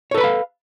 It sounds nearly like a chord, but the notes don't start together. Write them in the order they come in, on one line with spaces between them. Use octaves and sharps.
C#5 A4 B4 B5 F5